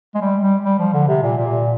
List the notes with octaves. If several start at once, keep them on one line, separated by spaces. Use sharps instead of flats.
G#3
G3
G3
G3
F3
D3
C3
A#2
A#2